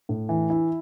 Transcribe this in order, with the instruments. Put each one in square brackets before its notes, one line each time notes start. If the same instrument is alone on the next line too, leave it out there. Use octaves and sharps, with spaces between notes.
[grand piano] A2
E3
E4